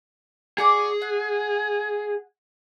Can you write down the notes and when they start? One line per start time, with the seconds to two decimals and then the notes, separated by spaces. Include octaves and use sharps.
0.58 F#4 G#4 D5 D6
1.02 F#5